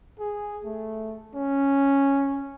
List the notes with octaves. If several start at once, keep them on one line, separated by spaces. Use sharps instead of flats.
G#4
A3
C#4